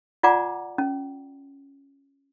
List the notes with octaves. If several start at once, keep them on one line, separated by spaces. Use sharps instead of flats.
F4 D5 F#5 G#5 A#5 D6
C#4